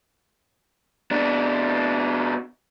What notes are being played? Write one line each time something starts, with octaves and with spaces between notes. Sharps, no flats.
B2 D4